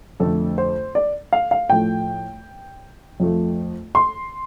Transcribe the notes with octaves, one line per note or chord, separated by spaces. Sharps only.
F2 D3 A3 A4
C5
D5
F5
F5
A2 F3 A3 G5
F2 F3 A3
C6